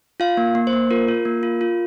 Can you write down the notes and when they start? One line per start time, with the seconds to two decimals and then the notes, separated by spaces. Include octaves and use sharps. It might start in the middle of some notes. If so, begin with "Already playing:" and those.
0.20 F4 F5
0.37 A#3
0.55 A#3
0.67 C5
0.73 A#3
0.91 F4 A#4
1.08 F4
1.25 A#3
1.43 F4
1.61 F4